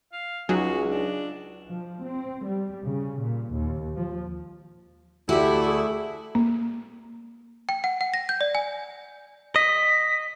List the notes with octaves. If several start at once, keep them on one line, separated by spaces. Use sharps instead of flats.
F5
C#2 F#3 D#4 F#4 G#4
D4
F3
C4
G3
C#3
A#2
D#2
F3
D2 A3 E4 F#4 G4
G#4
A#3
G5
F#5
F#5
A#6
G6
D5
G#5
D#5 B6